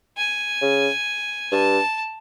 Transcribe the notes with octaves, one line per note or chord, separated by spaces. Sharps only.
G#5
C#3
G2 A5